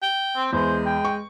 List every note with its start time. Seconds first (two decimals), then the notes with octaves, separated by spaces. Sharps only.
0.02 G5
0.36 C4
0.53 E2 G#3 C5
0.86 G5
1.05 C#6